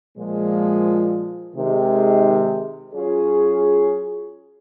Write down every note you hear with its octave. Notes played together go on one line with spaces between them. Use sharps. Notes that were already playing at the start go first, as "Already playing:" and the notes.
A#2 F3 G#3
C3 D#3 G#3
F#3 C#4 F4 G#4